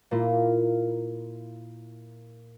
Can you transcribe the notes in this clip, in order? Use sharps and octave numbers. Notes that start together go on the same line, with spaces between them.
A#2 A#3 E4 F4